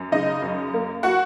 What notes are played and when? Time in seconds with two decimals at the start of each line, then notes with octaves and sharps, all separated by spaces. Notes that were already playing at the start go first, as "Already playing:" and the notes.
Already playing: F#2
0.12 C#3 D#4 D#5
0.42 F#2
0.74 A#3
1.03 F#4 F#5